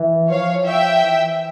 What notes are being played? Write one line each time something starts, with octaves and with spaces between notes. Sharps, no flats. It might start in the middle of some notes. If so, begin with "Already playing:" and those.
Already playing: E3
F3 C#5 F5
E5 G5
E3